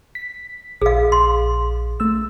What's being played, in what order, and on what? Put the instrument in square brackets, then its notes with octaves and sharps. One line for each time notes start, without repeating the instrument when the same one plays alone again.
[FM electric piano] B6
[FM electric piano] A#1 [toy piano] G#4 F5
[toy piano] C6
[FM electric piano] A3 E6